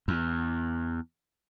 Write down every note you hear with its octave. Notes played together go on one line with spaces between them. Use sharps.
E2